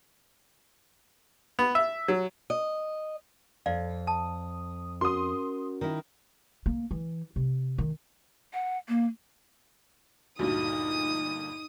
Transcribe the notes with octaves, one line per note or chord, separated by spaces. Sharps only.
B3
E5
F#3
D#5
F2 D5 F5
A5 D#6
C#4 F#4 A#4 C6 D#6
D#3 E4
A#3
E3
C3
D#3
F#5
A#3
D2 G2 A#2 D#4 F#4 D#6 D#7